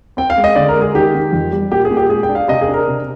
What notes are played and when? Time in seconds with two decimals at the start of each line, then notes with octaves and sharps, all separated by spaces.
0.17 C4 G5
0.30 F5
0.37 G#3
0.44 D#5
0.55 D3 D5
0.68 A#4
0.76 G#3
0.82 G#4
0.94 D#3 G4
1.14 D#3
1.33 F2
1.53 G3
1.71 A#2 G4
1.85 G#4
1.91 A#2
1.97 G4
2.10 G#3 G#4
2.23 G5
2.29 D4
2.35 F5
2.48 C3 D#5
2.61 G#4
2.68 D4
2.74 A#4
2.88 C3